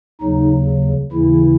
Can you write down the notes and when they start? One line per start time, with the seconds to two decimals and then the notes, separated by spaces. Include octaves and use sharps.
0.21 D#2 C#3 F#3 D#4
1.12 D#2 C#3 E3 E4